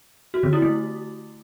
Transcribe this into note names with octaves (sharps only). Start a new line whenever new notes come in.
F#4
D3
E4
A3